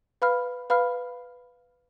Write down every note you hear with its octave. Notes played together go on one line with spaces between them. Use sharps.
B4 F5 B5 F6
B4 F5 B5 F6